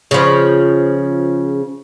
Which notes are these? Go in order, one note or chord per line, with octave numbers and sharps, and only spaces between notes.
C#3 F3